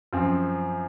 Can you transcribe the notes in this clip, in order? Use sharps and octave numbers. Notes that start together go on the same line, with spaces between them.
F#2 F3 C4